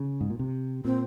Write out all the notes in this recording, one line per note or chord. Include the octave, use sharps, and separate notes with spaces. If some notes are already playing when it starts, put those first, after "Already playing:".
Already playing: C#3
G#2
A#2
C3
A#2 C4